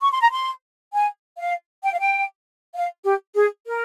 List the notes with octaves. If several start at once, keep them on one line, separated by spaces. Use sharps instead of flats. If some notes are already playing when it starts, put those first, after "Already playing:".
C#6
C6
A#5
C6
G#5
F5
G5
F5
G5
F5
G4
G#4
A#4